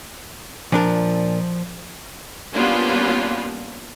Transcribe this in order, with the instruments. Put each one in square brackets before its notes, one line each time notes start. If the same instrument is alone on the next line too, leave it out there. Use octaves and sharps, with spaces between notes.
[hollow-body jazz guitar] A#2 D4 A#4 [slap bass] F3
[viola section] G3 A#3 B3 C#4 D4 F4